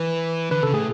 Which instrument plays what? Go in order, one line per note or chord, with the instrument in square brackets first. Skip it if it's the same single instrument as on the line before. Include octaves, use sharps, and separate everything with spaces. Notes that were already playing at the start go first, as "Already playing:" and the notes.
Already playing: [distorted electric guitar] E3 [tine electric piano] B4
[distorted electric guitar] D3 [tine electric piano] B4
[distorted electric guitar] C#3 [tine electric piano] A4
[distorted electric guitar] A2 [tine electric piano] G#4